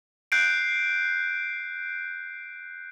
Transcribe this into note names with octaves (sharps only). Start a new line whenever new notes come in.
F#6 G6 C7 D7